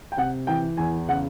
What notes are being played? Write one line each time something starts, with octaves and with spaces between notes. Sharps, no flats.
G5
C3 F#5
E3 G5
E2 G#5
C#3 F#5